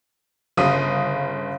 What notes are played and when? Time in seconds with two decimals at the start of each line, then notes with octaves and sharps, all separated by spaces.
0.57 G1 C#3 F5 D#6 D#7